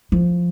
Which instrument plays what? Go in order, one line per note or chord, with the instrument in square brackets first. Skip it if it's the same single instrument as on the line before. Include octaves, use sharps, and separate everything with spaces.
[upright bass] F3